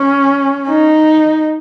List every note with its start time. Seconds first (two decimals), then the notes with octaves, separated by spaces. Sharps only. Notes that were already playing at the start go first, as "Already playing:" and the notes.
Already playing: C#4
0.68 D#4